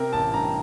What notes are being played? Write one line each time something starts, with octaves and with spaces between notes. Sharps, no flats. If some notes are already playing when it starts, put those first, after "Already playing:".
Already playing: C3 C4 A#4
A1 A5
G2 A#5